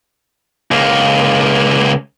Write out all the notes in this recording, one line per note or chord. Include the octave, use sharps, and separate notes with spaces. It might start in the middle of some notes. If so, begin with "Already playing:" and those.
C#2 A#3